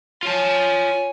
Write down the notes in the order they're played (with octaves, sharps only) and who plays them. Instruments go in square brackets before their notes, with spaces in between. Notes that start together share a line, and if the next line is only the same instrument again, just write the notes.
[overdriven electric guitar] F4 A5 [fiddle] C#5 G#5